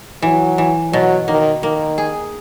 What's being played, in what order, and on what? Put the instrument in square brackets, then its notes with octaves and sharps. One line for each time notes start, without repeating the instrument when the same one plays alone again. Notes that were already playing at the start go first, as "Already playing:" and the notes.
[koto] E3 [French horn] F#3
[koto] E3
[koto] B2 [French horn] F#3
[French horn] D#3 [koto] A#3
[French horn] D#3 [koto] A#3
[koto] G#4